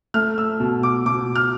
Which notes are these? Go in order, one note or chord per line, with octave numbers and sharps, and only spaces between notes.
A3 F6
E6
B2
D6
B2 D6
F6